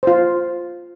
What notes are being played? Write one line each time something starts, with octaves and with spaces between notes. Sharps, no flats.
F4 C5